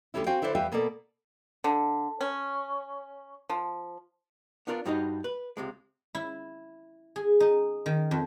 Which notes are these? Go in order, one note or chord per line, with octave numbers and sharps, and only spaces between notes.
D2 G#2 D3 G3 C#4 E4
C4 F#4 F5 G5 G#5
D3 E4 B4 C5 D5
E2 G3 B4 E5 F5 G5
B2 A#3 B3 A4 D5
D3
C#4
F3
B3 D4 F4 A#4 B4 D5
G2 G3 D#4 F#4 C5 D#5
B4
C#2 C3 G#3
E4
G#4
D#4
D#3
F2